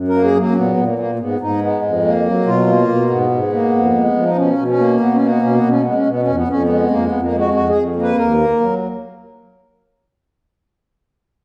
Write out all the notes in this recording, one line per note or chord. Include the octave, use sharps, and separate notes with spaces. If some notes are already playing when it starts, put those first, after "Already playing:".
Already playing: F#2
A#4
A#3
G#4
F#3 A#3
C#4
A#2 B3
A#2
A#3
A#3
A#3
G#2 B3
G#2 D#4
G#3 B3
F2
A#3
F#3
B2 F4
A#3
B2
G#2 B3
G#2
A#3
F2
G#3
F3
D#4
B2 C#4
B2
C#4
A#3
B2 B3
C#4
A#3
B3
B2 C#4
B3
B2 C#4
G#3 B3
C#4
B2 B3
C#4
F2
B3
F2 C#4
B3
G#3
F2 A#3
B3
F2
A#3
G#3
F#4
F2 F#4
G#4
F2
A#3
B4
D#2 A#4
A#3
F#3